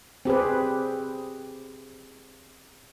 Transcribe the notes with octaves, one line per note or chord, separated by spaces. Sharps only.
C4 G4 G#4 B4